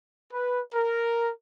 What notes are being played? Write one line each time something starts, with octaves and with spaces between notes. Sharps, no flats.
B4
A#4